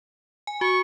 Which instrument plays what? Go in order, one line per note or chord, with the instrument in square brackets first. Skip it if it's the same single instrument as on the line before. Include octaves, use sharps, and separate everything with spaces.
[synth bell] G#5
[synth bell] F#4 [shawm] C#6